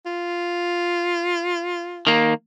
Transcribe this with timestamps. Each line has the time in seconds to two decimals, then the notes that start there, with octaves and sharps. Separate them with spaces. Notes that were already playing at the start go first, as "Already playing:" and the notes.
0.06 F4
2.07 D#3 A#3